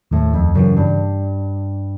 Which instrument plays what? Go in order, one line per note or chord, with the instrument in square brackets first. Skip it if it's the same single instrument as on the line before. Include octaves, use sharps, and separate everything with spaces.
[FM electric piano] D#2 [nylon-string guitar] A2
[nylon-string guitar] F2
[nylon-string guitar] F#2 [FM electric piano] C#3 E3
[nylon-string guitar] G2